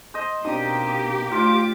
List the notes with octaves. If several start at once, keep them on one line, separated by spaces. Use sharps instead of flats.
C5 D#5
B2 A#3 C4 D4 D#4 G4 D#6
D2 D#4 F4 C5 F5 D6